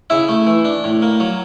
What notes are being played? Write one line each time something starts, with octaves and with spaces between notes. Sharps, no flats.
C#3 E4 E5
A3
E3
D4
A2
A#3
F#3